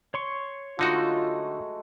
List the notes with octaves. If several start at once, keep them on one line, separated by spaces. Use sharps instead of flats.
C#5 C6 C#6
D3 F#3 G#3 A3 D#4 F4 F#4